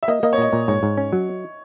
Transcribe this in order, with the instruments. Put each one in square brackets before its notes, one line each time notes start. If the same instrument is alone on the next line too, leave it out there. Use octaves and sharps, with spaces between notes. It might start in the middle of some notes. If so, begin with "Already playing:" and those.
[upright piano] E5
[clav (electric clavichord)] A#3 [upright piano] D#5
[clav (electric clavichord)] A#3 [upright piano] D#5
[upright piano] C#5
[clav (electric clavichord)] A#2 [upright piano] D#5
[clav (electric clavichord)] A#2
[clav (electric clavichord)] G#2 [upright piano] C#5
[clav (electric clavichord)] G#2
C#4
F#3